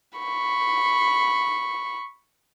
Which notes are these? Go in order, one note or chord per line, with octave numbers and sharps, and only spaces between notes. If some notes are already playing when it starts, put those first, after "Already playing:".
B5 C#6